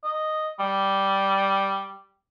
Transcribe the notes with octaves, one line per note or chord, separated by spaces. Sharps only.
D#5
G3